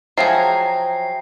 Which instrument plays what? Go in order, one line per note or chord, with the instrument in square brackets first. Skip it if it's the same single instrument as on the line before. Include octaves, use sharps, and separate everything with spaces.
[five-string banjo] F3 F#3 G#4 [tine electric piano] E5 G5 A#5 [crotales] C7